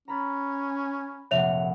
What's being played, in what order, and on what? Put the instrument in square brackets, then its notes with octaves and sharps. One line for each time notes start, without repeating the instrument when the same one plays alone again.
[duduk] C#4 [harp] A#5 B5 A6
[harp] F1 A#1 F#5 [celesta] C#5 E5 F7